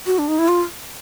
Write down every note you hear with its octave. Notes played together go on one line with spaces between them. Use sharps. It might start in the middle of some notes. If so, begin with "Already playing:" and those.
F#4
D4
D#4
E4
F4